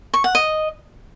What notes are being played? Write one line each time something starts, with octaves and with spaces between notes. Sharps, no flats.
C#6
F#5
D#5